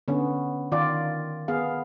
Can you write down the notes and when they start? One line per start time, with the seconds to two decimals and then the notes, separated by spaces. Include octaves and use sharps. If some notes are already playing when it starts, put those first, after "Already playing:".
0.08 D3 B3 C#4
0.72 D#3 F4 D5
1.48 B3 G#4 F5